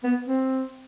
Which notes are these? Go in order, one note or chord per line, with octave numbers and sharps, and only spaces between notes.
B3
C4